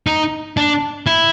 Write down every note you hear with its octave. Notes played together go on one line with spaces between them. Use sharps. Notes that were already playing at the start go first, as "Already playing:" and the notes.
D#4
D4
E4